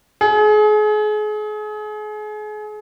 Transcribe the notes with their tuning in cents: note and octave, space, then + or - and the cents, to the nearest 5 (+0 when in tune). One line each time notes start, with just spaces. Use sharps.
G#4 +35